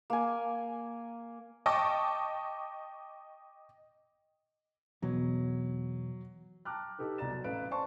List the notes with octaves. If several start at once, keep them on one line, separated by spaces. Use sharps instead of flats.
A#3 G#5
D#5 G5 A5 C#6 D6
E2 B2 F#3 C#5
G5 A5 A#5 D6 F6 F#6
D#4 G4 A4 B4
C2 B2 D5 A#5 A6 E7
F#3
A1 A4 B4 F5 D7
C5 D5 G#5 A5 C6 C#6